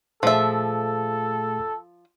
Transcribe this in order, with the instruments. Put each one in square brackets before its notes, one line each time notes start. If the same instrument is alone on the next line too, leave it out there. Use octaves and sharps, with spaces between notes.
[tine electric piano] A#2 A3 G#4 [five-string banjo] F3 E5 [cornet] A4